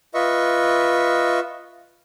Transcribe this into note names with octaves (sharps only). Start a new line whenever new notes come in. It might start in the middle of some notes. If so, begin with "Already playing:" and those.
F4 B4 D#5 E5 C#6